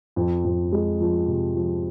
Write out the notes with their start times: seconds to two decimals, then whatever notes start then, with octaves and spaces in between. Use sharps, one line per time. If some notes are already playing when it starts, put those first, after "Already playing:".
0.16 F2
0.44 F2
0.72 G#3
1.00 F3
1.27 C3
1.55 F3